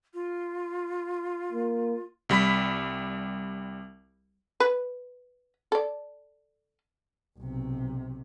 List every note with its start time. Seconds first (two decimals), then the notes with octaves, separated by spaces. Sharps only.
0.14 F4
1.53 A#3
2.29 C2 G3 B5 B6
4.60 B4
5.72 A4 D5
7.39 B1 C3